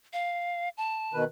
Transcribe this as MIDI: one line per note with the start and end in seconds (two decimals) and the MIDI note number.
0.13 0.69 77
0.77 1.18 81
1.14 1.24 47
1.14 1.24 51
1.14 1.24 71